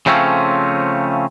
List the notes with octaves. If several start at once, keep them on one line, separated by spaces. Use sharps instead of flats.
C#3 F3 A3 C4 C#4